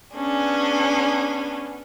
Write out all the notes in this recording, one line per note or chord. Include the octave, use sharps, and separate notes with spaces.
B3 C#4 D4 G#4